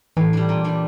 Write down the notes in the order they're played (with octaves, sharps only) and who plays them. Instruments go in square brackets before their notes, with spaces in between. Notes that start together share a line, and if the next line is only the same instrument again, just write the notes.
[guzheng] A2 [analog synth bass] E3
[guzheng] G3 D4
A#2
G3 D4